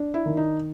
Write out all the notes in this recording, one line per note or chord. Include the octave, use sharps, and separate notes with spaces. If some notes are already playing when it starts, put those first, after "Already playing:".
Already playing: D4
E4
D#3
D#4